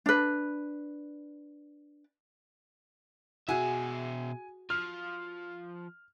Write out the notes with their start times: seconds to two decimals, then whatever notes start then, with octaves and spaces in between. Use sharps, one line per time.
0.06 D4 B4
3.49 B2 F#4 G#4 E5 G#5
4.70 F3 F6